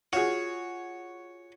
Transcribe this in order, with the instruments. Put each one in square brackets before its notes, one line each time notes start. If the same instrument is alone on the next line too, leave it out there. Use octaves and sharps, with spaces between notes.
[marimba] F4 [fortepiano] F#4 G#4 [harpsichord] C#5